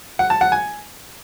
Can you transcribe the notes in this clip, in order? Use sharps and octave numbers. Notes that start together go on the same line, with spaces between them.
F#5
A5
F#5
G#5